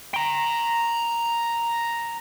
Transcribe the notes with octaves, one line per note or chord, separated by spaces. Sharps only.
G5 A#5